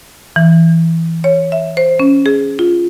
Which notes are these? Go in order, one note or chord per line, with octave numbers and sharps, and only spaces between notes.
E3
C#5
E5
C5
C#4
G#4
F4